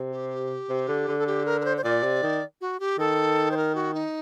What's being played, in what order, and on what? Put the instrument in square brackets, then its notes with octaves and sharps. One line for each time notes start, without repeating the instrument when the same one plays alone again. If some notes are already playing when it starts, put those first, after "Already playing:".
Already playing: [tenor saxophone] C3
[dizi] G4
[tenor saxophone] C3
D3
D3
[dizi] A4
G4
A#4
A#4
C5
C5
[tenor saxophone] A#2 [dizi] D5
[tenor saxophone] C3
D#3
[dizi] F#4
G4
[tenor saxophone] D#3 [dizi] A4
[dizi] C5
A#4
F#4
D#4